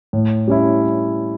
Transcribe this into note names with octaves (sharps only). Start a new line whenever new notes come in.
A2
G3 C#4 E4